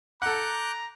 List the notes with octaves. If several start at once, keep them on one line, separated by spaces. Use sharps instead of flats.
A4 F#5 A#5 D6 F#6 G6